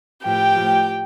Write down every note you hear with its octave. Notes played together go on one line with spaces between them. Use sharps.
A2 F3 G4 G5
A2 F3